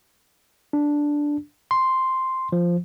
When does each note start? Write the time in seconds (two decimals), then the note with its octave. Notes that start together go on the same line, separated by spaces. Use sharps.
0.73 D4
1.71 C6
2.52 F3